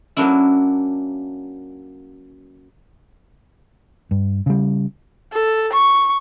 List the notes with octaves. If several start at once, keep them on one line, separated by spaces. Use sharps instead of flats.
F#3 A#3 C#4 D4 E4
G2
C#3 G3
A4
C#6